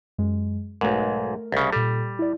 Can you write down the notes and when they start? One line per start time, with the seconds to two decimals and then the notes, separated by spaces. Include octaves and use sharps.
0.18 F#2 G#3
0.81 B1 G#2 A3 A#4
1.52 C2 C#3
1.73 A#2 G3 A4
2.19 E4 D5